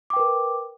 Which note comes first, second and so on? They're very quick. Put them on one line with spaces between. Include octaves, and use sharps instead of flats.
D6 G5 B4 A#4